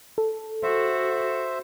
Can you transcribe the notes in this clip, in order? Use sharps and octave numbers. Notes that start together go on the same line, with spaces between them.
A4
F#4 C5 E5